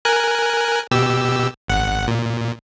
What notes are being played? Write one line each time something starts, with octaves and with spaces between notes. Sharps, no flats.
A#4 G#5 F#6
B2 G4 E6
G#1 F#5
A#2